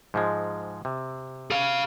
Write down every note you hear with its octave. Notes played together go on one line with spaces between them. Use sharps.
G#2 F3 G#3
C3
G#4 F5